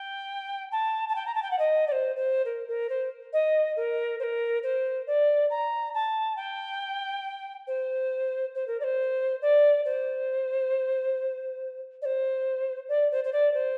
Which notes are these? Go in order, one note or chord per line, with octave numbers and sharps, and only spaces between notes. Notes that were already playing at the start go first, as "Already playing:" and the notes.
Already playing: G5
A5
A5
G5
A#5
A5
G5
F#5
D#5
D5
C5
C5
A#4
A#4
C5
D#5
A#4
C5
A#4
C5
D5
A#5
A5
G5
C5
C5
A#4
D5
C5
D5
C5
D5
C5
D5
C5
C5
D5
C5